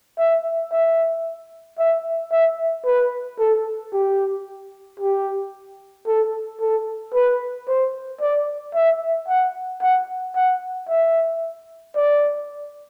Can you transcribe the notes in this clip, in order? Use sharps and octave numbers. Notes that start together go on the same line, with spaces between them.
E5
E5
E5
E5
B4
A4
G4
G4
A4
A4
B4
C5
D5
E5
F#5
F#5
F#5
E5
D5